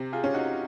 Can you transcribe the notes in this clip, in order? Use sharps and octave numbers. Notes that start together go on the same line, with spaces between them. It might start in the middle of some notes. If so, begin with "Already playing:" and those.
Already playing: C3
F4 G#4
C#4
D#4 F#4